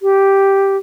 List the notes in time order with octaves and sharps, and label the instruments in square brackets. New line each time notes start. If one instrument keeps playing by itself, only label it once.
[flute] G4